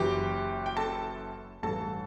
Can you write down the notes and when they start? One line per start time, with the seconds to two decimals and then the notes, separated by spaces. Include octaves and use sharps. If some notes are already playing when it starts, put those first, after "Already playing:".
Already playing: F#1 F#2 E3 G4 G5
0.66 G5
0.77 A4 A5
1.63 A1 G2 E3 A4 A5